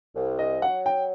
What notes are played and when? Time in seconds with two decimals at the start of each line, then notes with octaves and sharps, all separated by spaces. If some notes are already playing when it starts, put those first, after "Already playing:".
0.15 C2
0.39 D#5
0.62 F#3 F#5
0.86 G5